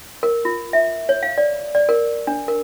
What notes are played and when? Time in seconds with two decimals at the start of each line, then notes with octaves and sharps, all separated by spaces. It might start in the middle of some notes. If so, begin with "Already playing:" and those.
0.23 A#4
0.45 F4
0.73 E5
1.09 C#5
1.23 F5
1.38 D5
1.75 D5
1.89 A#4
2.27 D4
2.48 A#4